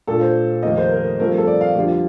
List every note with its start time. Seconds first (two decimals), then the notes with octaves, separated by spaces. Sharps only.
0.07 A#2 A3 D4 F4 A4
0.21 C5
0.63 F1 F2 D#3 A#3 D#5
0.78 C5
0.91 A#4
1.19 G2 F3 A3 C4 A#4
1.38 A4
1.47 D5
1.61 F5
1.75 F2 D3 G3 D4 F4